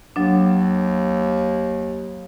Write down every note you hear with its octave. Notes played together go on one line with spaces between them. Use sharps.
D#2 F#3 D4